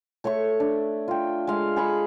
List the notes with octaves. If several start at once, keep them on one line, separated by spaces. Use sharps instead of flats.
A3 C#5 E5 C#6
D4
F4 G5
G#3 F5
G#4 B5 C#6